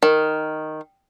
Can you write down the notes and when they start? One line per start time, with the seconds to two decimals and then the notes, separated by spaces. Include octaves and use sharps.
0.03 D#3